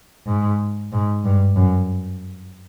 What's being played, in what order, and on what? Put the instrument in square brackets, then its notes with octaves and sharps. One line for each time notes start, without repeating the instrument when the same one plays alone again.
[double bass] G#2
G#2
G2
F#2